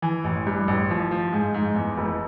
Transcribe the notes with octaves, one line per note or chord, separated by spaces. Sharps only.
E3
A1
G2
A1
F3
F3
G#2
G#2
E2
F1